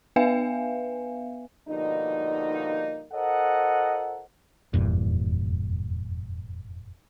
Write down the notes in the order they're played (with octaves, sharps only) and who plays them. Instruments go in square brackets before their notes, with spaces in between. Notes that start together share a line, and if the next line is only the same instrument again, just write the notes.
[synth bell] B3 B4 E5 F5 G#5
[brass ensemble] B2 D3 F3 G3 A#3 D#4
F4 A4 A#4 C5 D#5 F#5
[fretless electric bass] F1 E2 G2 A#2